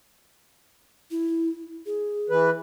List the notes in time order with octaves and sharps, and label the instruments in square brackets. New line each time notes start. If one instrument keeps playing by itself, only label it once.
[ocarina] E4
G#4
[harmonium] E3 B4